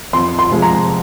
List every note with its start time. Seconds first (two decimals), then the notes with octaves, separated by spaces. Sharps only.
0.13 F2 C6
0.39 C6
0.50 C3 F3 G#3
0.62 A#5